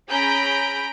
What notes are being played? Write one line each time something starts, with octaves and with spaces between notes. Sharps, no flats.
C#4 G#4 A#5 B5 G6 D7